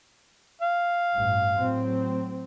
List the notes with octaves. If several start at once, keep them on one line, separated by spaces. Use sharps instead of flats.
F5
A1 G2
A2 F#3 C4